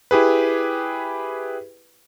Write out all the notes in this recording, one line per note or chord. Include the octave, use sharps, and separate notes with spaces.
E4 G4 G#4 B4